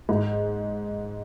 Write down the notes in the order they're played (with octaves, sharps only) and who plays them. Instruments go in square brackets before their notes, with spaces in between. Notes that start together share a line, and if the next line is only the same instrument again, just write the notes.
[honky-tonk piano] G#2